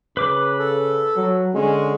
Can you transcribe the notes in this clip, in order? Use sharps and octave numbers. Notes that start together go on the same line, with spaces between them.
C#3 B4 D6
A4
F#3
D3 G#3 C#4